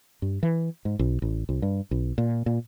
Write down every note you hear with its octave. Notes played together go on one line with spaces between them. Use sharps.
G2
E3
G#2
B1
A1
C2
G2
B1
A#2
A#2